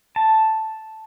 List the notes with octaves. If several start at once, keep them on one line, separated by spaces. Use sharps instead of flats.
A5